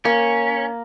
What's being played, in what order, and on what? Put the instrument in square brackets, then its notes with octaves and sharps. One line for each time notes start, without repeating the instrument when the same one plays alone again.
[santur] A#3 [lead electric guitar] C#4